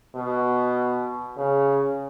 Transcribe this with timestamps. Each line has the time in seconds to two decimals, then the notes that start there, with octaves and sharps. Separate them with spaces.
0.16 B2
1.38 C#3